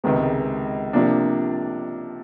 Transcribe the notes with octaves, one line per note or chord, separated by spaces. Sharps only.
C#2 C3 D#3 G#3 B3
C3 F3 A#3 D4